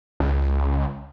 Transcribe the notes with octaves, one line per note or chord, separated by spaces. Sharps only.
C#2